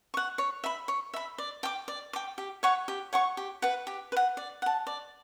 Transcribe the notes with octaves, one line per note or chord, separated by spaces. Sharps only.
F#5 C#6
C#5
E5 B5
C#5
E5 B5
D5
G5 D6
D5
G5 D6
G4
C#5 F#5 C#6
G4
C#5 F#5 C#6
G4
B4 F#5
G4
B4
F#5
D5
F#5 A5
D5